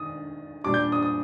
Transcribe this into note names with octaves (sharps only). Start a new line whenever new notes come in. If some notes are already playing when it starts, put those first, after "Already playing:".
Already playing: D#3 D4 D#6
A#2 G3 D4 D6
G6
D#6
D#6